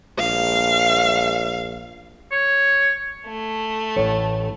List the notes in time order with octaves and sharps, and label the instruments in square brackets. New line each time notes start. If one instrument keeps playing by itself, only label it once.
[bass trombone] A#1 [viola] F5
[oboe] C#5
[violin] A3
[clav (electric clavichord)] A1 A2 [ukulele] C#5